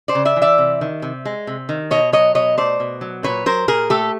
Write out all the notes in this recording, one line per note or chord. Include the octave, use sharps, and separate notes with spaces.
C5 D5
C#3
D5 E5
E3
D5 E5
C3
D#3
C3
G#3
C3
D#3
B2 C#5 D#5
F#3 C#5 D#5
B2 C#5 D#5
A3 C5 D5
B2
F#3
A#2 B4 C#5
F#3 A#4 C5
A#2 G#4 A#4
A3 G4 A4